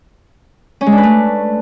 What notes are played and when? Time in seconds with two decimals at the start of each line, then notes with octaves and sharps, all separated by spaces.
0.81 C#4
0.86 G#3
0.92 D4
0.98 B4
1.03 A3